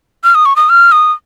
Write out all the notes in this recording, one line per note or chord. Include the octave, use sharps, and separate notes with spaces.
F6
D#6
C#6
D#6
F6
D#6